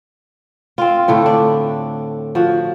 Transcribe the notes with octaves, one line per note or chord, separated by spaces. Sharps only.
C4 F4
A2 D3 A3
D4
F3 F#4